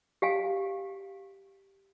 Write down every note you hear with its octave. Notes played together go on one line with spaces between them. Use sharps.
G4 F5 G#5